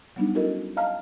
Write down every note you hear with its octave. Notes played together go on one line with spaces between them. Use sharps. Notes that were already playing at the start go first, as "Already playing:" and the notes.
F#3 G3 B3 D4 D#4
C#4 E4 F#4 A4 A#4 D#5
D#5 F5 A5 A#5 F6